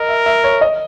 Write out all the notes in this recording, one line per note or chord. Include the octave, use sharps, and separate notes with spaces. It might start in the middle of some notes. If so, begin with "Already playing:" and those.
Already playing: A#4 D#5
E5
E5
C#5
D#5